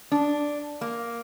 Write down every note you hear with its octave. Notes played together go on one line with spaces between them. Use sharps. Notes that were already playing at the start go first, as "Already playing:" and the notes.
D4
A#3